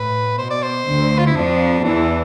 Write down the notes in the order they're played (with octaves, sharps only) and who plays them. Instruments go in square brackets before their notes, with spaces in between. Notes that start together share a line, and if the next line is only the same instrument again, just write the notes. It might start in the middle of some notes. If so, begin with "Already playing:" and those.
Already playing: [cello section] A2 [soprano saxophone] B4
[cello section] B2 [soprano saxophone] C5
[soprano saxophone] D5
C5
[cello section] D2 D3
[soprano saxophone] F4
E4
[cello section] F2 F3 [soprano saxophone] D4
[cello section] E2 E3 [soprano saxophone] D4